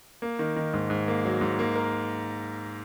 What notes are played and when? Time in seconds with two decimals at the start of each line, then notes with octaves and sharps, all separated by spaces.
0.22 A#3
0.39 D#3
0.56 D#3
0.73 G#2
0.90 G#2
1.08 A#3
1.25 F#3
1.41 G#2
1.59 A#3
1.76 A#4